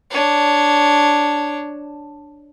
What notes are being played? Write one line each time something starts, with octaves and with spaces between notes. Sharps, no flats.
D4 C#5